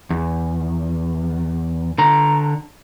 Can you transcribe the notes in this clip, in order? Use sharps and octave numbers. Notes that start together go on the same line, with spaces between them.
E2
D3 A#5